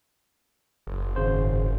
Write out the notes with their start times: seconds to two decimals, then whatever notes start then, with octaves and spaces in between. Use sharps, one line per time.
0.87 F#1
1.16 G#1 C#3 C5